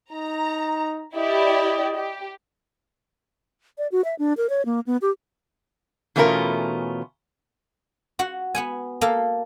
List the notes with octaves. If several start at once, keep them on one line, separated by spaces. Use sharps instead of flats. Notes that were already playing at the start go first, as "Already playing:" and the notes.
D#4 A#5
E4 G4 D5 D#5
G4
D5
F#4
E5
D4
A#4
C#5
A#3
B3
G4
E2 B2 A3 C#4 F4 A#4
F#4 F#5
B3 F#5 G#5
A#3 A4 F5